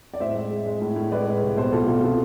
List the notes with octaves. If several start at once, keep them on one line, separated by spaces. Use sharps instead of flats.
D5
A2 C5 E5
G#3
G#3
G#3
A2
A2
G#3 B4 D5
G#3
C2
B2 A4 C5
B2 F4 A4
B2 F4 A4
C3 F4 A4